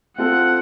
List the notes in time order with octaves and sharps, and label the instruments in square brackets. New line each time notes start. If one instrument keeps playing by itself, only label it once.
[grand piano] C4 F4 A4 [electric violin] F#5